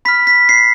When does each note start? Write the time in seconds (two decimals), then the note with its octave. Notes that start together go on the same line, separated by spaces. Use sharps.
0.05 B5 F6 B6
0.27 B6
0.49 C7